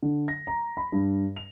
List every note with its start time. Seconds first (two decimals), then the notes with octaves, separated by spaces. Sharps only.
0.02 D3
0.28 A#6
0.47 A#5
0.77 B5
0.92 G2
1.36 F7